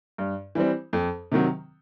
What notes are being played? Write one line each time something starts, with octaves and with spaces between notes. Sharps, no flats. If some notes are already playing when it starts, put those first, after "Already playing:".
G2
E3 G3 C4
F2
C3 D#3 F#3